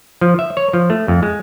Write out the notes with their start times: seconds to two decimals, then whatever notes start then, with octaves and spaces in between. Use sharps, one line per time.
0.21 F3
0.39 E5
0.57 C#5
0.73 F3
0.90 A3
1.08 F2
1.23 G#3